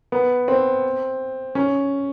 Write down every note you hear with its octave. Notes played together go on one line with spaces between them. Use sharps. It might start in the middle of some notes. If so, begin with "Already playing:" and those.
B3
C4
C#4